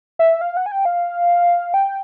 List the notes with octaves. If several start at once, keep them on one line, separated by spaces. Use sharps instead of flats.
E5
F5
F#5
G#5
G5
F5
G5